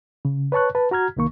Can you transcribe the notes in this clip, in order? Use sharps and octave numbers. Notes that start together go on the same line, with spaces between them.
C#3
B4 C#5 A5 C#6 F#6
B4 A5
F#4 A#5 F6 G#6
C2 D#3 A#3 C#6